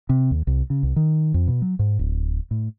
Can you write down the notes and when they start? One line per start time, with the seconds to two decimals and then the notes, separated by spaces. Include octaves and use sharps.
0.09 C3
0.31 D#2
0.47 C2
0.70 C#3
0.83 C2
0.96 D#3
1.34 F2
1.48 B2
1.62 F#3
1.79 G#2
1.99 D1
2.51 A2